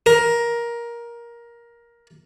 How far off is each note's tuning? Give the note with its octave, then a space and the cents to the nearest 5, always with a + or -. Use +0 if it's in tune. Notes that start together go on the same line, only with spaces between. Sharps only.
A#4 +15